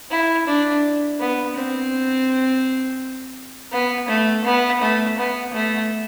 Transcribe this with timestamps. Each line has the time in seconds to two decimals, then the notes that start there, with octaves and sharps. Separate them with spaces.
0.10 E4
0.47 D4
1.20 B3
1.56 C4
3.72 B3
4.09 A3
4.44 B3
4.81 A3
5.18 B3
5.54 A3